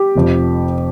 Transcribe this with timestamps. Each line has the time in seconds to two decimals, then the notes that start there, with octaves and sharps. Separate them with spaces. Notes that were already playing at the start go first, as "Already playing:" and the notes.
Already playing: G4
0.15 F1 F2 F3